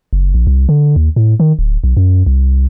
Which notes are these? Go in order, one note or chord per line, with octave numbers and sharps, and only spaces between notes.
F#1
A#1
C2
D3
D#2
A2
D#3
D1
B1
F#2
C2